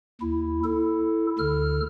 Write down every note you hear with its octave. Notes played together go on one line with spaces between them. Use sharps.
D#2 E4
E4 A4
D2 D3 A4 F6